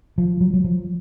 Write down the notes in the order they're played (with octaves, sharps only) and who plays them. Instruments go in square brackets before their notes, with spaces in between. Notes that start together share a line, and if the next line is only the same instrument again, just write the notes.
[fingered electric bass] F3
F#3
F#3
F3